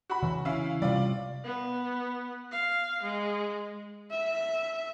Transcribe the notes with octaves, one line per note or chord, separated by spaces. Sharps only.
F#4 B5
C#3 E3
C#4 E4 F5
C3 G3 F4 D5
B3
F5
G#3
E5